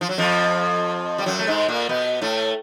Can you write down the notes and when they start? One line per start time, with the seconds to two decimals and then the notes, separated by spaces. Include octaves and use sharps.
0.01 F3
0.09 F#3
0.18 F2 F3
1.18 G3
1.26 F#2 F#3
1.39 A3
1.47 G#2 G#3
1.69 A#2 A#3
1.89 B2 B3
2.22 A2 A3